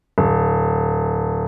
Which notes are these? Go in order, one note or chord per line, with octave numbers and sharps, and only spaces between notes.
D1